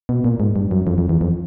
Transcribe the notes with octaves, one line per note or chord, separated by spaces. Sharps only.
B2
A#2
G#2
G2
F#2
F2
F2
E2
F2